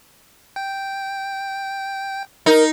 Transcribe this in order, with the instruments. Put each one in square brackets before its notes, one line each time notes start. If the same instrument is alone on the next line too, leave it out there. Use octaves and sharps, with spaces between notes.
[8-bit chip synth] G5
[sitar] D#4 [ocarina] A#4